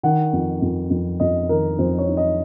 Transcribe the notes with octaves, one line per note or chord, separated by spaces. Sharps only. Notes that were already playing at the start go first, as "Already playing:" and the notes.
D#3 F#5
F2
F2
F2
F2 D#5
D#3 A#4
F2 C5
C#5
D#4
D#5